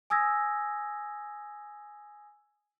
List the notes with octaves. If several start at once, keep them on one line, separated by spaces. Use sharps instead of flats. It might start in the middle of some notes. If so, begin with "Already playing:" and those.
G#5 D#6 E6 G#6 A#6